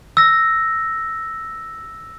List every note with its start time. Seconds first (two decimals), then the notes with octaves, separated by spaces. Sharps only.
0.17 E6 A#6